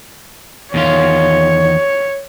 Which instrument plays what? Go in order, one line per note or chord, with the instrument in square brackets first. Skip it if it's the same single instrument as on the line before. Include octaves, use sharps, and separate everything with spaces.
[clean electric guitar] E2 D#3 F4 [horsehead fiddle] C#5